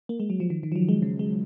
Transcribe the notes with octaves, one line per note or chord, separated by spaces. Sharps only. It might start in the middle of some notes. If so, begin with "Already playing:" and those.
A#3
G#3
F#3
F3
D#3
D#3
F3
F#3
G#3
C#3
G#3